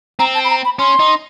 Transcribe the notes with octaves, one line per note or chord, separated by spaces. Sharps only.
C4 A#5
A5
B5
A#5
B5
C#4 C6
D#4